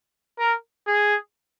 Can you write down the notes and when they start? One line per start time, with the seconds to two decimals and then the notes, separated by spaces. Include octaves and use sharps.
0.39 A#4
0.87 G#4